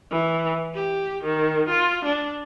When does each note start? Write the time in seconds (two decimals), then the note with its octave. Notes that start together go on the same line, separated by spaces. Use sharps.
0.11 E3
0.74 G4
1.24 D#3
1.69 F4
2.05 D4